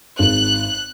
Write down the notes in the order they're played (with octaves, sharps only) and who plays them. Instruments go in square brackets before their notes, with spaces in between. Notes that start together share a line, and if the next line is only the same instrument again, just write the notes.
[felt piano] G#1 [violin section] F#6